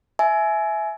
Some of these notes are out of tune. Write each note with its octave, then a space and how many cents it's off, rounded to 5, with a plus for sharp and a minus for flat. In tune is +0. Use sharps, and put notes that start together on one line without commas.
E5 +0 G#5 +25